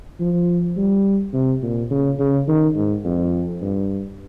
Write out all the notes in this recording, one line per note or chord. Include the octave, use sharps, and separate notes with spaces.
F3
G3
C3
A#2
C#3
C#3
D#3
G#2
F2
G2